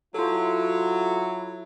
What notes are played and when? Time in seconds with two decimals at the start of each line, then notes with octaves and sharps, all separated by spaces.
0.14 F#3 E4 F4 A4